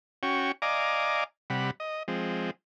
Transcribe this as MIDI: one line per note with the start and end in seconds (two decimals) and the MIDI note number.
0.23 0.52 61
0.23 0.52 66
0.23 0.52 79
0.23 0.52 85
0.62 1.24 74
0.62 1.24 75
0.62 1.24 77
0.62 1.24 80
0.62 1.24 82
0.62 1.24 86
1.50 1.71 48
1.50 1.71 55
1.50 1.71 78
1.50 1.71 83
1.80 2.03 75
2.08 2.51 53
2.08 2.51 56
2.08 2.51 60